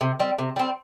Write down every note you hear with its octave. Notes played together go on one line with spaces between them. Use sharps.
C3
G3 C4
C3
G3 C4